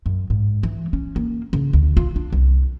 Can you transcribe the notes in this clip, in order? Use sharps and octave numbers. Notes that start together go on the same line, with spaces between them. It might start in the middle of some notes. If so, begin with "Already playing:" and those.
F#2
G#2
E3
C#4
A#3
C#3
D2
F4
D4
C2